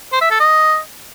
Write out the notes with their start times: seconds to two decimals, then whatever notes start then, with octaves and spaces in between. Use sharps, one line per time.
0.13 C5
0.22 E5
0.31 A4
0.40 D#5